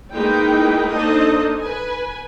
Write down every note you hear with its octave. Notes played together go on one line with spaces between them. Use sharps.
G#3 A#3 D#4 E4 B4 G5
A#3 D4 D#4 A4 C5 D#5
B4 G#5